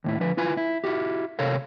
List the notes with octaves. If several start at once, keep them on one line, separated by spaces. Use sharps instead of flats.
D#2 A2 E4
D3 F3 B4
E4 F4 B4 G#5
E4
E4 F#4 G4
C3 A4 A#4 C#5 F5